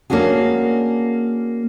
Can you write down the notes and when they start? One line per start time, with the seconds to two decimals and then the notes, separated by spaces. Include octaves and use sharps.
0.10 A#3 C#4 D4 F#4 G#4